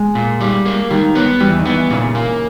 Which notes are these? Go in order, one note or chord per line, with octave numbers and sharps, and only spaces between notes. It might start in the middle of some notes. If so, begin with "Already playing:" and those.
Already playing: G#3
A#2
G3
A#3
D#3 G3
B3
E2 G3
E3
D#3
E3 B3
A#2 C#3
A#3